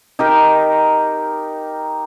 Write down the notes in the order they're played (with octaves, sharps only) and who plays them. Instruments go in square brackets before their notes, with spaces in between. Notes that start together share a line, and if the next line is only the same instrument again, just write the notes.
[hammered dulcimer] D#4 G4 A#4